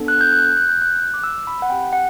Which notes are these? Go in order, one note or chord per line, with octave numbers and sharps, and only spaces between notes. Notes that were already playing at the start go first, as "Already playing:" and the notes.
Already playing: B3 D4 A4
F#6
G6
F#6
G6
F#6
G6
F#6
D6
E6
B5
F#5
C4 G4 G5
F#5